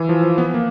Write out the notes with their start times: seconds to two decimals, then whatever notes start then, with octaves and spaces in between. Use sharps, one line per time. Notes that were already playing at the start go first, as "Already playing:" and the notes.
Already playing: E3
0.09 F3
0.23 F3
0.38 B3
0.54 A#3